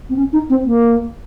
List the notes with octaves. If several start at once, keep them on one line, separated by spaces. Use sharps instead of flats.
C4
C#4
D#4
C4
A#3